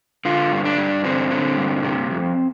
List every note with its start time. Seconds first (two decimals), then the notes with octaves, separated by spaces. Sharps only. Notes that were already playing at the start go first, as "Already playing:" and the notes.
0.25 D3 F4
0.52 G2
0.65 D4
0.78 G2
1.04 D3 C4
1.31 D3
1.57 G2
1.83 C3
2.10 F2